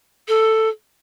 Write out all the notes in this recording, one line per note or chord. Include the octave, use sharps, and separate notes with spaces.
A4